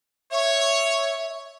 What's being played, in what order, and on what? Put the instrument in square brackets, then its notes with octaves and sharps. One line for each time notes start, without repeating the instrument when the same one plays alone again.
[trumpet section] C#5 [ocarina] E5